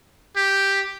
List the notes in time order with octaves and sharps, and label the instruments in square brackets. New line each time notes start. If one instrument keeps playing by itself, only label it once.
[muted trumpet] G4